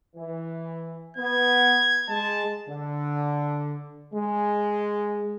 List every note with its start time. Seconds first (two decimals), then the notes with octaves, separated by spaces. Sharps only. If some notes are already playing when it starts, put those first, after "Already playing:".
0.16 E3
1.17 B3 G#6
2.09 G#3 A5
2.69 D3
4.14 G#3